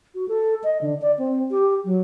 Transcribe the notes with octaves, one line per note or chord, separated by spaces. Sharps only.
F#4
A4
D#5
D3
D5
C4
G4
F#3